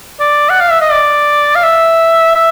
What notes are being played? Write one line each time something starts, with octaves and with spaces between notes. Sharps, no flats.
D5
F#5
F5
E5
D#5
D5
F5
E5
E5